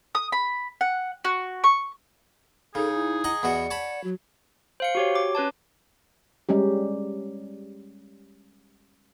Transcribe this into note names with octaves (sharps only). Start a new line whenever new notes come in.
D#6
B5
F#5
F#4
C#6
C#3 D#4 G#4 A4
E4
D#5 F#5 A#5
E2 B2 F#4 D5 F#5
C#5 A5 B5
F#3 F#4
C5 F5 C#7
F#4 G4 C#5
D6
C#4 B4 C#5 A5
G3 G#3 C#4 G4